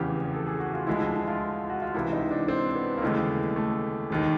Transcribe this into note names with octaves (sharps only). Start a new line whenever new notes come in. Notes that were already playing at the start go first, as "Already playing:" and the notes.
Already playing: F1 E2 C#3 E3 G4
A4
G#4
F#4
F4
D2 D3 F3 G#3 E4
E4
E4
F4
F#4
F4
C#2 C3 E3 E4
D#4
D4
C4
B3
A#3
D#2 C#3 E3 G#3 A3
A3
E1 D#2 D#3